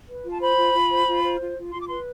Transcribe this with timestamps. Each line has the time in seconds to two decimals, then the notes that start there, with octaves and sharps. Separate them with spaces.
0.08 B4
0.24 F4
0.31 A5
0.41 C5 B5
0.57 F4
0.73 F4
0.91 C5
1.06 F4
1.23 C5
1.39 F4
1.56 F4
1.73 F4 C6
1.80 D6
1.87 B4 C6